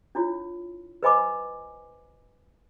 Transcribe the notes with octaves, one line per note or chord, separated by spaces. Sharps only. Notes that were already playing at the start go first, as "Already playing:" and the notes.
D4 E4 F4 C#5
B4 C5 D#5 G#5 B5 D6